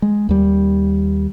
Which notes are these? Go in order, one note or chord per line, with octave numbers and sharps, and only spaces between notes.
G#3
D#2 G3